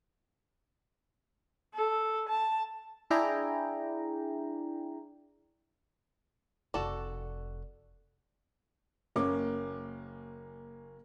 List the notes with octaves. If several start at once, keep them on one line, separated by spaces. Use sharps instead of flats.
A4
A5
D4 E4 G#4 D5 G5 A#5
F1 F#4 A4 D5
F#1 A#3 C#4 D6